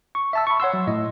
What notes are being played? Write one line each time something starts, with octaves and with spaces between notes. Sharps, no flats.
C#6
E5 A5 E6
B5 C#6
C#5 F#5 C6 E6
F#3
A2 D#5